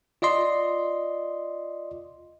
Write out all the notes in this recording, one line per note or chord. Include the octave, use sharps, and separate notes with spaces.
F4 D5 D#5 C6